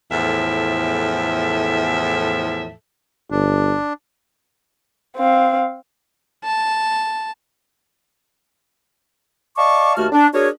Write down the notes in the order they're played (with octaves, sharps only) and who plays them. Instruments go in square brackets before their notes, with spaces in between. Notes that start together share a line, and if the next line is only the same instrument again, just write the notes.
[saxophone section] E2 A2 F3 A4 E5
[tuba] G1 [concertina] D4
[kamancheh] C4 F5
[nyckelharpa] A5
[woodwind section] D5 D#5 F5 A5 C#6 D6
D#2 A3 F#4 A5 F6
D4
D4 F#4 G#4 A#4 C#5